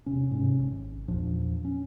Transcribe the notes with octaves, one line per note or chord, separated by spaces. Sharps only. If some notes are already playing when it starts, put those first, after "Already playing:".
E1 C3 C#4
G#2 C3 C#4
G#1
E2 A#2 F3 D4
C#4